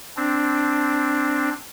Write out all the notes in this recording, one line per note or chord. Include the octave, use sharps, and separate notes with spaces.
C4 D4